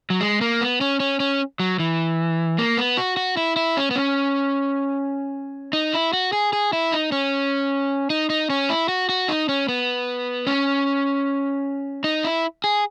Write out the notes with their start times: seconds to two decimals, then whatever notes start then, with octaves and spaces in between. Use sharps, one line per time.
0.10 F#3
0.21 G#3
0.41 A#3
0.61 B3
0.81 C#4
1.00 C#4
1.20 C#4
1.60 F#3
1.79 E3
2.58 A#3
2.78 B3
2.97 F#4
3.17 F#4
3.37 E4
3.56 E4
3.77 C#4
3.91 B3
3.96 C#4
5.73 D#4
5.94 E4
6.13 F#4
6.33 G#4
6.53 G#4
6.73 E4
6.92 D#4
7.12 C#4
8.10 D#4
8.30 D#4
8.50 C#4
8.70 E4
8.89 F#4
9.09 F#4
9.28 D#4
9.49 C#4
9.68 B3
10.47 C#4
12.04 D#4
12.25 E4
12.64 G#4